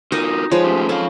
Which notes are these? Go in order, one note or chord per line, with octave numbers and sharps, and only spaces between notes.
D#4 F4 F#4 A#4 D#5
F3 G#3 B4 C#5
A3 C#4 G4
C#4 A4 F5